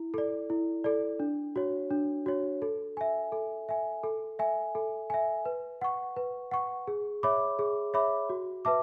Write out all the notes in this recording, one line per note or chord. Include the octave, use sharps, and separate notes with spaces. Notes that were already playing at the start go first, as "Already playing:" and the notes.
Already playing: E4
A4 D5
E4
A4 D5
D4
F#4 C#5
D4
F#4 C#5
A4
E5 G#5
A4
E5 G#5
A4
E5 G#5
A4
E5 G#5
B4
F#5 C#6
B4
F#5 C#6
G#4
C#5 E5 B5 D6
G#4
C#5 E5 B5 D6
F#4
B4 E5 A5 D6